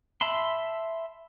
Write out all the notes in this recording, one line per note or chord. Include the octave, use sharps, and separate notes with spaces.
E5 A5 B5 C6